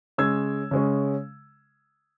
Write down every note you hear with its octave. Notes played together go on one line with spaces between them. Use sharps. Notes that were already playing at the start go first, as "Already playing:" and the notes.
C#3 G#3 C#4 E6 G#6
C#3 G#3 C#4